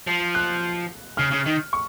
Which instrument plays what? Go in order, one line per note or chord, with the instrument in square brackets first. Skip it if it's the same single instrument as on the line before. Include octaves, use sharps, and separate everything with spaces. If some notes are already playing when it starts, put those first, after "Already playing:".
[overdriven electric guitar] F3
[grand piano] F#6
[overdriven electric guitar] C#3 [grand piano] F6
[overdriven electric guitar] C#3
D#3
[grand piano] C#6